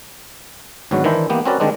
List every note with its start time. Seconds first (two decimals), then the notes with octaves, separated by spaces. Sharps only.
0.91 G#1 G#2 D3 F#3 B3 F#4
1.04 D#3 E3 D4 E4 C5
1.29 E3 A#3 B3 G4
1.45 C4 C#4 F#4 A#4 B4 D5
1.60 D3 D#3 G#3 C4 D4 D#4